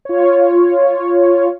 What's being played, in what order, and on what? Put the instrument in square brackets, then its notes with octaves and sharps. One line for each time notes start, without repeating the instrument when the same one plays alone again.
[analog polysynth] F4 C#5